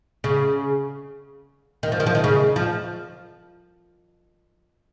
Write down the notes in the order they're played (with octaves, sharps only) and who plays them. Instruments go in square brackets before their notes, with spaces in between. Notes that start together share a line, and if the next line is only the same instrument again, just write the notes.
[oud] C#3
D#3
F3
D#3
F3
D#3
C#3
F3